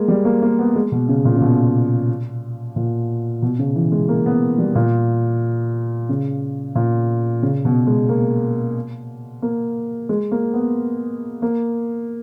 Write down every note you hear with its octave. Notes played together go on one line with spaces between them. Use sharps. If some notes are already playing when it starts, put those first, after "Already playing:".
Already playing: G#3 A#3
G3
A#3
A#3
B3
G#3
B2
C#3
A#2
C#3
B2
A#2
B2
C#3
E3
G#3
A#3
B3
G3
A#2
C#3
A#2
C#3
B2
G#3
A#3
A#3
G#3
A#3
B3
A#3